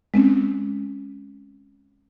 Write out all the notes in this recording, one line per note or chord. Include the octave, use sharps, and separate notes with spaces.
G#3 C4 C#4